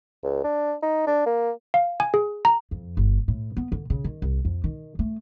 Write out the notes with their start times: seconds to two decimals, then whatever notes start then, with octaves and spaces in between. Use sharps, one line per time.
0.24 C#2
0.44 D4
0.82 D#4
1.07 D4
1.26 A#3
1.74 F5
2.00 G#5
2.14 G#4
2.45 A#5
2.71 F2
2.97 G1
3.28 A2
3.57 B3
3.72 D3
3.90 C#3
4.04 D#3
4.22 C2
4.45 F2
4.64 D#3
4.99 A3